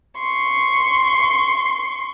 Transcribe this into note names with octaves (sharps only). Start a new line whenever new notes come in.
C6 C#6